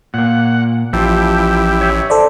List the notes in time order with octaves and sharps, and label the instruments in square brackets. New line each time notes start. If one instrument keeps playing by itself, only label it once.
[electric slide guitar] A#2 A#3 [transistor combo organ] F#5
[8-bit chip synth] A1 [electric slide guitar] F3 [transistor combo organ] E4 G4
[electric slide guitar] C#5 E5
[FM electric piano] A4 C5 D5